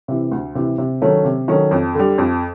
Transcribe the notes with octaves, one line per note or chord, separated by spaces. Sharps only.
C3 E3
D2
C3 E3
C3
D#3 F#3 A3 C#4
C3
D#3 F#3 A3 C#4
F2
D3 G3
F2